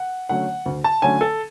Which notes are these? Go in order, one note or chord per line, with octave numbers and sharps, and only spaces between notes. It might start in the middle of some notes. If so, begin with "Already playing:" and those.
Already playing: F#5
D3 F#3 A3 C#4 F#5
D2
A5
D3 F#3 A3 C#4 G#5
A4